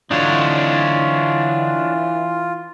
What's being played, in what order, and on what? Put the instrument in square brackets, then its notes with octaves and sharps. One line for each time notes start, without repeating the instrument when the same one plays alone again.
[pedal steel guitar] D3 F#3 D#4 [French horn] E3 [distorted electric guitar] D4 C#5 [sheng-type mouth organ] F4